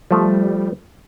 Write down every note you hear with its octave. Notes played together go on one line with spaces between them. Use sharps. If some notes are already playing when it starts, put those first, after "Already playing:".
F3 G3 A3